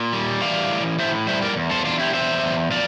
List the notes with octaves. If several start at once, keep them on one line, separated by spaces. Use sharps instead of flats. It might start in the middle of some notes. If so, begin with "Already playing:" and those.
Already playing: A#2
G3
E3 D5 F5
A2
A2 C5 E5
G3 C5 E5
A#4 D5
E2
A4 C5
E2 D4 F4
E4 G4
E2 C5 E5
E2
F3 D5 F5